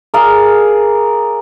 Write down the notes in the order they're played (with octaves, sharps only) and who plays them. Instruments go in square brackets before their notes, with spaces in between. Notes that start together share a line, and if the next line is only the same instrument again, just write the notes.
[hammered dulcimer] G#4 A#4 D5 F5